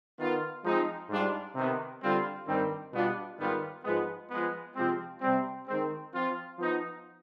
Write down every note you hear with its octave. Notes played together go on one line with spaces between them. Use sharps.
D#3 B3 F4
F3 G#3 C4 D#4
G#2 G3 D4 F4
C3 D#3 B3
D3 G3 C4 F4
G2 D#3 G3 C4
B2 G3 B3 D4 F4
G#2 D#3 G3 B3 F4
G#2 F3 G#3 B3
F3 G#3 B3
C3 F3 G#3 C4
C3 G3 C4
D#3 G#3 C4
F3 C4 F4
F3 B3 D#4